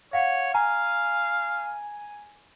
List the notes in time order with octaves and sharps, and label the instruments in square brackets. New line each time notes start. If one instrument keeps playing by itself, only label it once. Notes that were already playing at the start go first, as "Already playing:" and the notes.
[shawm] C#5 [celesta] F5 F#5
[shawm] F5 [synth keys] G#5 [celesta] A#5